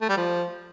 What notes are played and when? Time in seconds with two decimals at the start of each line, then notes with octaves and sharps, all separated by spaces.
0.01 A3
0.09 G3
0.17 F3